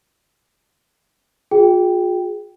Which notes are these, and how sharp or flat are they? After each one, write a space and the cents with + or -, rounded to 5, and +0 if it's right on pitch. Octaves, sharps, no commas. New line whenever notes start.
F4 +45 G#4 +0 G5 +0